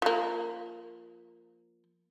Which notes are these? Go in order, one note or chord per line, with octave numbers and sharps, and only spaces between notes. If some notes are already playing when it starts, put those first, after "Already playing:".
F3 A#3